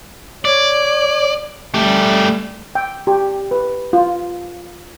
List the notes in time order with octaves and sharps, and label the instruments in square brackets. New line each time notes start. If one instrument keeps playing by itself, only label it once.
[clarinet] C#5 [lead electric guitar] D5
[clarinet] G3 [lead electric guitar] A3 G4
[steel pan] G5
G4
B4
F4